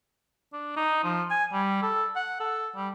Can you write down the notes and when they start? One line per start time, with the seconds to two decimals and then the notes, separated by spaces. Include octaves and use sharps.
0.53 D4
0.76 D#4
1.04 F3
1.31 G#5
1.53 G3
1.82 A4
2.16 F#5
2.40 A4
2.76 G3